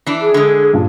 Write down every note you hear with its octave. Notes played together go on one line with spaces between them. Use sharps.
E3 D4
G#4
D3 G#3
G2 A#2 A5